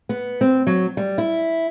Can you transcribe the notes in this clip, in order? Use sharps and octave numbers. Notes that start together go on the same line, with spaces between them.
B3
C4
F#3
G3
E4